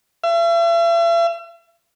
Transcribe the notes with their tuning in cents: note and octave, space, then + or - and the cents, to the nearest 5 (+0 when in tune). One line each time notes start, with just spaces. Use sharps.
E5 +45